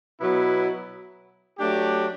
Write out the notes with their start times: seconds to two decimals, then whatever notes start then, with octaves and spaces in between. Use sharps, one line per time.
0.20 B2 F#3 B3 E4
1.58 F#3 A3 D4 G4